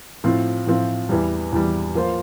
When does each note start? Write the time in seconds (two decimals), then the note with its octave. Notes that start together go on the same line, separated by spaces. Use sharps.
0.24 A2 F3 C4 F4
0.67 A2 F3 C4 F4
1.09 E2 E3 G3
1.52 E2 E3 G3
1.95 F3 A#3 F4 C5